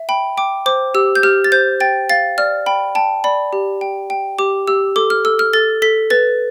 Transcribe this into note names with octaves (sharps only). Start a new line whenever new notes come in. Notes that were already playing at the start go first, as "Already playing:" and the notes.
Already playing: E5
G5 B5
G5 D6
C5 D6
G4 E6
G6
G4 F6
A6
C5 G6
G5 A6
F5 A6
D5 F6
G5 B5
G5 A5
D5 B5
G4
G5
G5
G4 D6
G4 E6
A4 D6
F6
A4 E6
F6
A4 A6
A4 B6
B4 A6